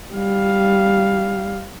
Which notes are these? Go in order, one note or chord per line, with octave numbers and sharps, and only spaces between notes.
G3 F5